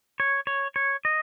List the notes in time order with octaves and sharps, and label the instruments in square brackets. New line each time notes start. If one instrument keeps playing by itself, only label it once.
[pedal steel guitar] C#5
C#5
C#5
D#5